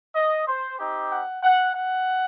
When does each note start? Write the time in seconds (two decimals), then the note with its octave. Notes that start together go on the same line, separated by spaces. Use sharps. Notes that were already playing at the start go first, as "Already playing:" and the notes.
0.15 D#5
0.48 C5
0.79 C4 D#4 G4
1.11 F#5
1.43 F#5
1.75 F#5